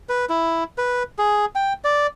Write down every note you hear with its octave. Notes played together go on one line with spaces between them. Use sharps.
B4
E4
B4
G#4
G5
D5